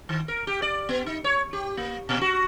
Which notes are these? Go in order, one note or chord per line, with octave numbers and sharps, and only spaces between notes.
D#3
A#4
G4
D5
B3
D#4
C#5
G4
A#3
A#2
F#4